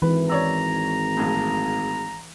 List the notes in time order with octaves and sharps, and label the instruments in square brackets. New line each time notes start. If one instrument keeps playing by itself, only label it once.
[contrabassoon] G#1 [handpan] E3 [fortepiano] B4
[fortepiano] C#5 D5 E6 [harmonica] A#5
[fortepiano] A#1 A2